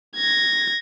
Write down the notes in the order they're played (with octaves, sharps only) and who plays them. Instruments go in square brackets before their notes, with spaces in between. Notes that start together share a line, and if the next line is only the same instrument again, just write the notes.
[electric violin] G#6 A#6